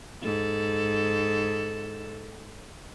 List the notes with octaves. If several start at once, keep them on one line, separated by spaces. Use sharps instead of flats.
G#2 A4